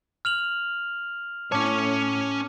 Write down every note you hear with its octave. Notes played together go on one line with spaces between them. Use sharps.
F6 F7 F#7
A2 C#4 C#5 A5 D6